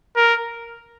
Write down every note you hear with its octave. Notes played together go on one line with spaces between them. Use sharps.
A#4